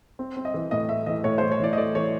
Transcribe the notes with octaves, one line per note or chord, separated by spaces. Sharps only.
C4
C4
D#5
E3
A2 D#5
A3 E5
E3 D#5
A2 C#5
C5
E3
C#5
E3 D5
D#5
A3 D5
E3 C#5